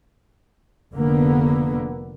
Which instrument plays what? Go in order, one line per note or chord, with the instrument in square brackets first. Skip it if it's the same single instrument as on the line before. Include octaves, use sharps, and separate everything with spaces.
[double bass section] F1 D3 A#3 B3